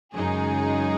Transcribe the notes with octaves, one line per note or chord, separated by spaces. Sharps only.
F#2 C#3 G#3 D#4 G#4